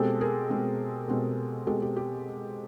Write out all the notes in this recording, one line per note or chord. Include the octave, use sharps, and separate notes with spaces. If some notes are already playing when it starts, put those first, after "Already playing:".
Already playing: B2 G#3 C4 G4 A4
G#4 A#4
B2 G#3 C4
B2 G#3 C4
B2 G#3 C4 G4 A4
G4
G4